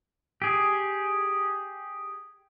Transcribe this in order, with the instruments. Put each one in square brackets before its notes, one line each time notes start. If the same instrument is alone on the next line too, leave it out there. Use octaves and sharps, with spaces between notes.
[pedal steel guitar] G4 G#4